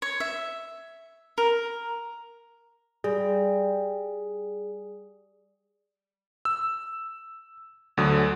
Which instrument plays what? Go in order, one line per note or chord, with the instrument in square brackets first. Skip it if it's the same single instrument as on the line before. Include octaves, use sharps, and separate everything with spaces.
[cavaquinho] C#5
E5
A#4
[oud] G3 [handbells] G#4
[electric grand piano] E6
D2 D3 F#3 D#6